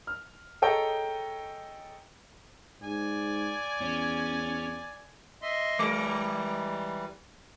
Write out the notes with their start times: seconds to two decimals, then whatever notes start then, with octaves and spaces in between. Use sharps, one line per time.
0.07 F6
0.62 G#4 A4 C#5 D#5 G5 A#5
2.83 G#2 D5 G#5
3.81 E2 C#4
5.42 D#5 E5 C6
5.79 E3 G3 G#3 A#4